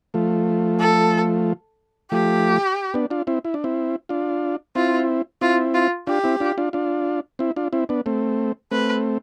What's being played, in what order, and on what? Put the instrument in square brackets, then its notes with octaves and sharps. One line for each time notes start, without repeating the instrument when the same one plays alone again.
[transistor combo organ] F3 A3
[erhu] A4
[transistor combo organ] F3 A3 [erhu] G4
[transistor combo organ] B3 D4
D4 F4
C4 E4
E4
D4
C4 E4
D4 F4
[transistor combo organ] C4 E4 [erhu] F4
[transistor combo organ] C4 E4 [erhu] F4
[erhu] F4
[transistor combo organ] D4 F4 [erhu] G4
[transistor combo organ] C4 E4
D4 F4
D4 F4
D4 F4
C4 E4
D4 F4
C4 E4
B3 D4
A3 C4
[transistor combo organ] A3 C4 [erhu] B4